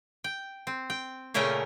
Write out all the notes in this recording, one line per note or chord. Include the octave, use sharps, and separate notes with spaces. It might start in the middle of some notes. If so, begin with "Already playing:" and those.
G5
C4
G5
A#2 C#3 A3 C#4 A#4 G5